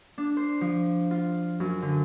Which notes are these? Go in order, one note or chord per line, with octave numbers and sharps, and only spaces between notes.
D4
C5
F3
F4
F#2
D3